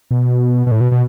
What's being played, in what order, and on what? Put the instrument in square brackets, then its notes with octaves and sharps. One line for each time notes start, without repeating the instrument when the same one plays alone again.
[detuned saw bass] B2
B2
A2
B2
B2